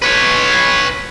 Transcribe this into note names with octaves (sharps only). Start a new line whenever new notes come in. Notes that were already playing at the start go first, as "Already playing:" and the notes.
B4 C#5